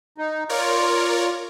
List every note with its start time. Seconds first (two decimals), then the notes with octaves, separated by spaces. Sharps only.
0.18 D#4
0.49 F4 A#4 C#5 D5